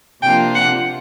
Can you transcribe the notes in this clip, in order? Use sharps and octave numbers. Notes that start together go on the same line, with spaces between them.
C3 F3 A#3 D4 F4 G5
F#5